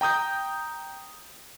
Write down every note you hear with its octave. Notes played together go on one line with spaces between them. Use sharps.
G5 A#5 D#6 G6